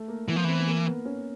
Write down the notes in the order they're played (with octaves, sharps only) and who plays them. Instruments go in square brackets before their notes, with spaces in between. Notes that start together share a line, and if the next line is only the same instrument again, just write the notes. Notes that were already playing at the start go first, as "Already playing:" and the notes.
Already playing: [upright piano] A3
A#3
[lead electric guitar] E3 [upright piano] B3
[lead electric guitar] F3
[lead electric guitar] E3 [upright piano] C4
[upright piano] B3
A#3
B3
C#4